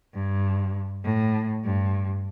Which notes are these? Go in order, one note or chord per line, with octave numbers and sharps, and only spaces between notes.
G2
A2
G2